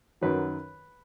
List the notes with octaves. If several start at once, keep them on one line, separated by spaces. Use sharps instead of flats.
F#2 D#3 F#3 B4